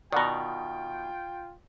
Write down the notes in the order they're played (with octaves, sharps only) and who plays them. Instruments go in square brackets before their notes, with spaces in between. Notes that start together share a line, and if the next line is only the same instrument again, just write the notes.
[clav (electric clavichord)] B2 D#3 [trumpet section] F4 G5 [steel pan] D5 F#5 A#5